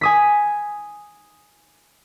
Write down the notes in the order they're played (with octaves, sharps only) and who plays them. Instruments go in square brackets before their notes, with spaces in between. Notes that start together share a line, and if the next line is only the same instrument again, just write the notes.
[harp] G#5 D#6 B6